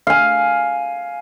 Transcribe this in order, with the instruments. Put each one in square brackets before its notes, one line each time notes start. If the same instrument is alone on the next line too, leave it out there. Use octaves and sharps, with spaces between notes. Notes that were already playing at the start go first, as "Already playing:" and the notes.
[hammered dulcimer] F5 G#5